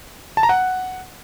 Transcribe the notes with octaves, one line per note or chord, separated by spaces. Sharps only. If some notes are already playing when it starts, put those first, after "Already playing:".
A5
A#5
F#5